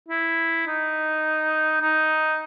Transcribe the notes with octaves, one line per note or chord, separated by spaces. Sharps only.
E4
D#4
D#4